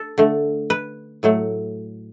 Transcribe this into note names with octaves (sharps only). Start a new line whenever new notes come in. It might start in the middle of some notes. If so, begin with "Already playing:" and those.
Already playing: A4
D3 A3
B4
A2 F#3 A3